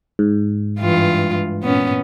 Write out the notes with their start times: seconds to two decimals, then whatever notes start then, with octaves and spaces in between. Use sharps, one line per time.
0.19 G#2
0.79 G2 E3 F4
1.63 A#2 B3 C#4